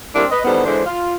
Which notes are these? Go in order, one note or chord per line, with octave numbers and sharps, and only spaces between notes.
G3 A#3 C4 D4 E4 A#4
B4 D#5
E2 D3 D#3 G3 B3 C5
D3 E3 G#3 D4 C5
F4